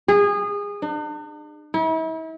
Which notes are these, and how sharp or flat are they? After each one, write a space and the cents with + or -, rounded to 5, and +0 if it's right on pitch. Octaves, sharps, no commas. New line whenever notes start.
G#4 -25
D4 +45
E4 -40